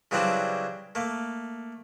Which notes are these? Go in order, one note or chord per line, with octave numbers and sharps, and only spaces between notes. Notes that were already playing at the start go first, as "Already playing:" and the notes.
C#3 E3 F#3 G3 C4 D4
A3 A#3